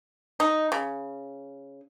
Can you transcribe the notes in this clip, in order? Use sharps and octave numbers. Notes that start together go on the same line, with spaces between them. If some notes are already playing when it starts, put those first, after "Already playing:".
D#4
C#3